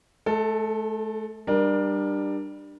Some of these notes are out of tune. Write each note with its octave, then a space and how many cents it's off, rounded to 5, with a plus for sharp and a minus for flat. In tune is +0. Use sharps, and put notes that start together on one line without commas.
A3 -40 A4 +10
G3 +0 D4 +20 A#4 +25